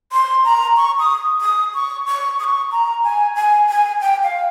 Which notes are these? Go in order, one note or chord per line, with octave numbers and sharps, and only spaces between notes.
C6
A#5
C#6
D#6
D#6
C#6
C#6
D#6
C#6
A#5
G#5
G#5
G#5
G5
F5